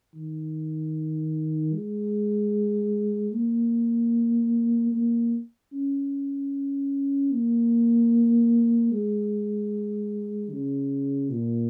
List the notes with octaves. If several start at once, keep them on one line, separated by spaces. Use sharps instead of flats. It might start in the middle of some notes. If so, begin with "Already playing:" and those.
D#3
G#3
A#3
A#3
C#4
A#3
G#3
C#3
A#2